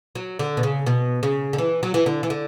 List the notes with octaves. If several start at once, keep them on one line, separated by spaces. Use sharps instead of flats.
F#3
D3
B2
C#3
B2
C#3
D3
E3
F#3
E3
D3
E3
D3